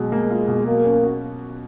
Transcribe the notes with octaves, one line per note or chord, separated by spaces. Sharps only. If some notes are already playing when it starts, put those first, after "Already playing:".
Already playing: B2 F#3 G#3
A#3
F4
B2
F#3 A#3
C#4
F#4